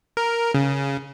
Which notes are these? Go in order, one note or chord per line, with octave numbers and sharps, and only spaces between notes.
A#4
C#3